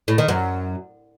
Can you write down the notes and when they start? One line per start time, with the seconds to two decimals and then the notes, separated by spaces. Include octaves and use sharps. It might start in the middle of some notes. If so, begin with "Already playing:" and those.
0.08 A2
0.18 D#3
0.28 F#2